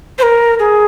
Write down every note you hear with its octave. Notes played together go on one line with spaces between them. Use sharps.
C5
A#4
G#4